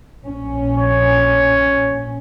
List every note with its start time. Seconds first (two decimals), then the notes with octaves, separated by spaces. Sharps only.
0.24 A#1 C#4
0.77 C#5